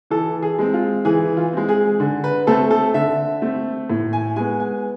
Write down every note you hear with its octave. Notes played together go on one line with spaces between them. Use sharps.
E3 A4
G#4
G#3 C4
F4
E3 G#4
F4
G#3 C4
G#4
D3
B4
A3 C4 A4
A4
D3 E5
A3 C4
A2
G#5
G#3 B3 G#5
G#5